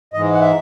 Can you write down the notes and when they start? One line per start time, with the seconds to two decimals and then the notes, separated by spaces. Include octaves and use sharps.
0.13 G#2 E3 G#3 D#5
0.33 F#5
0.40 E5